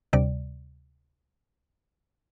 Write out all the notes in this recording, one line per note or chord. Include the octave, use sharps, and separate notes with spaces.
D2 C3 G3 D5